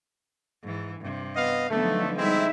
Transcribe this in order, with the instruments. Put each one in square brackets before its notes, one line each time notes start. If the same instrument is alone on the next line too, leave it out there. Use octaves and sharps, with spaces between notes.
[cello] G#2 E3
G2 C3
[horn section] B3 D#5 F5
[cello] D3 F3 [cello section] F#3 B3 D#4 [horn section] A3
[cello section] G3 D#4 E5 [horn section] G#3 C4 E4